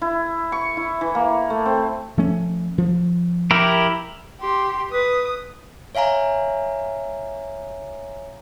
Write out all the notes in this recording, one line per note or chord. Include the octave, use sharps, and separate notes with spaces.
E4
C#6
E4
E3
A#3
A3
C4
F3 A3 C#4
F3
E4 G4 A#4
G4 C6
B4 D#6
C#5 E5 F5 G#5 A#5